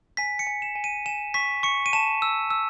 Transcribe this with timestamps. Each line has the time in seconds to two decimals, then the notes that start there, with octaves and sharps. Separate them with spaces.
0.17 G#5 B6
0.39 C#7
0.47 G#5
0.62 E7
0.76 G#5
0.84 D#7
1.06 G#5 E7
1.34 C#6 B6
1.63 C#6 C#7
1.86 D#7
1.93 A5 E7
2.22 E6
2.50 E6